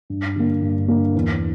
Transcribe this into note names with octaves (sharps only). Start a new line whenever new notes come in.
G2
D3 A#3
G2
D3 A#3
E2